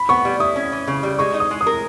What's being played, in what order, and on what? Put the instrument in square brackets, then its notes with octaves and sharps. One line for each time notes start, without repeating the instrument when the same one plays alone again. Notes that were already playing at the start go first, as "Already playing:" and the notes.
Already playing: [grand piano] B5
[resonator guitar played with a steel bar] B3 [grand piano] C#6
[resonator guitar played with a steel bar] G3
[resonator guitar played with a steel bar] E4 [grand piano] D#6
[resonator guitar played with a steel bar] C#4
E3
C#3
G3
[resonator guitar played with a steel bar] G#3 [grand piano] C#6
[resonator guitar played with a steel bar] D#4
[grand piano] D#6
[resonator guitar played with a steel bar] G#3
[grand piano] D#6
[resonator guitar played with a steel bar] A#4